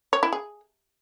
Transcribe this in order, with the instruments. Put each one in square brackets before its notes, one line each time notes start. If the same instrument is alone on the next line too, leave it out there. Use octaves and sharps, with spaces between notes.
[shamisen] C#5
E4
G#4